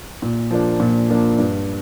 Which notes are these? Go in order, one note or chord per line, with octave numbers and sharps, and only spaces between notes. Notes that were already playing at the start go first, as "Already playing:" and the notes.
A#2
F3 A#3 D4
A#2
F3 A#3 D4
G2